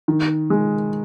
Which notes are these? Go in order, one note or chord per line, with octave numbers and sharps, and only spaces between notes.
D#3
G#3